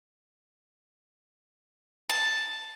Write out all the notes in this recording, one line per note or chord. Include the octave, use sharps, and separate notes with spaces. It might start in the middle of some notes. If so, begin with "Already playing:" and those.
A5